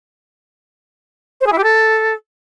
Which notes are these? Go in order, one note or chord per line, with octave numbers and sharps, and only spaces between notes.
C5
G#4
E4
G4
A4